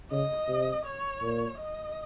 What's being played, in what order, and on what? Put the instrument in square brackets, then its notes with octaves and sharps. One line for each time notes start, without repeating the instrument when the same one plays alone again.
[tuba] C#3 [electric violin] D#5
[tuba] C3
[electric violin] C#5
[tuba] A#2
[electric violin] D#5